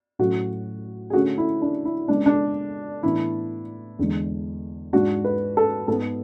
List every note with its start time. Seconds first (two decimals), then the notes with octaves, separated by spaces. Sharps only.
0.19 A2 F#3 C#4 F#4
1.10 G#4
1.13 D3 A3 C#4 F#4
1.38 E4
1.62 D4
1.85 E4
2.08 C#3 G#3 B3 D4
2.26 D4
3.03 A2 E3 B3 D4 E4
3.99 E2 D3 G#3
4.93 G#2 G#3 D4 F#4
5.25 B4
5.57 A4
5.88 G#2 G#3 B3 A4